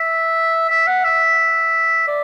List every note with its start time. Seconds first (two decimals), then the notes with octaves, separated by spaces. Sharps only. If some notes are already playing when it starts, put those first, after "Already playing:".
Already playing: E5
0.70 E5
0.87 F#5
1.05 E5
2.07 D5